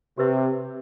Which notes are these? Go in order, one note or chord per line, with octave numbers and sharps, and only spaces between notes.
C3 G4 B4 E5